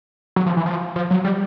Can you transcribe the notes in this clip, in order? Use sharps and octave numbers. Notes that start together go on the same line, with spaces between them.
F#3
F3
E3
F3
F3
F#3
G3